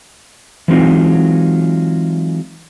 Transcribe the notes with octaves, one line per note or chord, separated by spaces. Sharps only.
E3 F#3 G#3 C4 D#4 F4